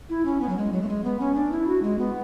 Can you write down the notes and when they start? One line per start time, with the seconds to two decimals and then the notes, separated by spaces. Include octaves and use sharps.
0.09 E4
0.25 C#4
0.41 B3
0.49 F#3
0.57 G#3
0.72 F#3
0.82 A3
0.88 G#3
1.04 B3
1.20 C#4
1.35 D4
1.51 E4
1.67 F#4
1.82 G#3
1.99 B3